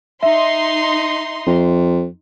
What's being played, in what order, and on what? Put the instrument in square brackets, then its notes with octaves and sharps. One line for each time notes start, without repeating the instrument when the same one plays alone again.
[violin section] D#4 C6 [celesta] E5
[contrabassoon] F2